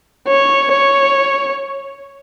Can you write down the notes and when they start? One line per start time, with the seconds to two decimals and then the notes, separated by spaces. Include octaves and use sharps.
0.28 C#5
0.72 C#5